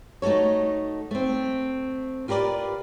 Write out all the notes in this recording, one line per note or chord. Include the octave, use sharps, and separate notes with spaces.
A3 D#4 F#4 A4 C#5
A3 C4
F4 G4 A#4 B4 D5